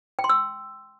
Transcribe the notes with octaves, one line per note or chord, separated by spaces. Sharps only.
G5
C6
E6